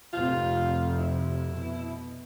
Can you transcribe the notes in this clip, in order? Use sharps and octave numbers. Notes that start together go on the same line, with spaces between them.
F1 F2 C3 F4
E4
B2